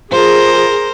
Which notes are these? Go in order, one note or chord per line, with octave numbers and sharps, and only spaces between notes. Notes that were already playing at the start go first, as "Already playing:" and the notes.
F3 G#4 A#4 C5